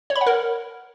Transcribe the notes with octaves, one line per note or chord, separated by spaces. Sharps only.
C#5
B5
F#5
A#4